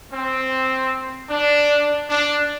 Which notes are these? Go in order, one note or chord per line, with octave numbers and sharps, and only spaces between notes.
C4
D4
D4